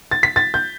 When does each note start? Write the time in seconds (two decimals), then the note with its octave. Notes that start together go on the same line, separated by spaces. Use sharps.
0.11 A6
0.23 B6
0.36 A6
0.54 G6